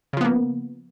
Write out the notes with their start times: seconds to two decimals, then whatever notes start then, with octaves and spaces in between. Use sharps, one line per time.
0.13 C#3
0.17 F3
0.21 B3
0.25 A#3